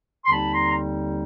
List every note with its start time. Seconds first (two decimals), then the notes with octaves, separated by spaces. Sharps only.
0.25 C6
0.30 D#2 D3 G3 C4 D#4 A5 B5
0.52 A#5 C6
0.69 A#5